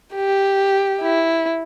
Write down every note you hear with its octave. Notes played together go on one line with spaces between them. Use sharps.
G4
E4